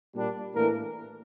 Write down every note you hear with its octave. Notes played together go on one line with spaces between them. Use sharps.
A#2 G3 A#3 D4
A2 E3 A#3 D4 A#4